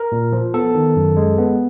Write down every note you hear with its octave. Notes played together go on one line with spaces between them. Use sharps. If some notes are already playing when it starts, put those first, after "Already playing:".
Already playing: A#4
A#2
F3
B3 A4
D#3
F#2
G#3
B3